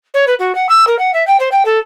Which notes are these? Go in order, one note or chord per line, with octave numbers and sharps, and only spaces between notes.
C#5
B4
F#4
F#5
E6
A#4
F#5
E5
G5
C5
G5
A4